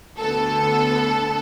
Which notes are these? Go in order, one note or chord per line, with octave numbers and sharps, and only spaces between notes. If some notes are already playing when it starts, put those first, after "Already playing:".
D2 D3 B3 A4